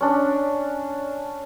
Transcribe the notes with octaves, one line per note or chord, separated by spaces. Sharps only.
C#4 D4